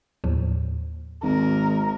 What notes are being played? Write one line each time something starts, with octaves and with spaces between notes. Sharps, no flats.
D#2 A2 F3
G#1 A#4